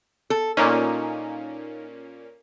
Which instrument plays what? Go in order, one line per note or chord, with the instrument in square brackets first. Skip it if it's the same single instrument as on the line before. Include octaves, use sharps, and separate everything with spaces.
[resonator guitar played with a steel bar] A4
[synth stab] A#2 A#3 C#4 [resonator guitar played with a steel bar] D#4